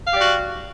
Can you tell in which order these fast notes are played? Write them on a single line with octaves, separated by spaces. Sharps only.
F5 G4 D5 F#4